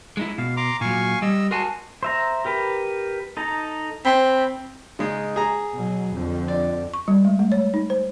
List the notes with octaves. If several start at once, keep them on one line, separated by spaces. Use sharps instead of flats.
G#3 D#4 E4
B2 F5
A#5 C6 D6
A#2 F#3 F5 G#5 C#6
G3 D#5 E6
F#4 A#4 G#5 A5 C6
C5 E5 A#5
G4 A#4 B4
D#4 A4 A#5
C4 B5
C#3 G#3 D#4
G#4 A#5
B2 F#3
F2 D3
D5
C#6
G3
G#3
A3
C#5
D#4
C5